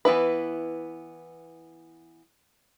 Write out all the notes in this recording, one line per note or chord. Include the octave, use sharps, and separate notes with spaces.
E3 B3 E4 B4